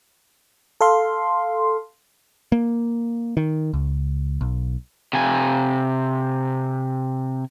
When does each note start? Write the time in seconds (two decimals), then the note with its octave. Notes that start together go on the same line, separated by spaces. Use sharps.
0.81 A4 F5 C6
2.52 A#3
3.37 D#3
3.74 C#2
4.41 B1
5.13 C3 G#5